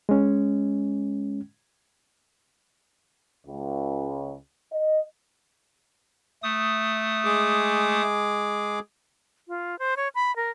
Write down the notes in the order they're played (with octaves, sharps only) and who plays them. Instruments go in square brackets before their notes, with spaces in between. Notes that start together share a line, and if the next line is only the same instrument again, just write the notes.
[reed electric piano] G#3 C#4
[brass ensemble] C#2
D#5
[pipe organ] A3 D#6
[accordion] G#3 G#4 D6
[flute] F4
C5
C#5
B5
A#4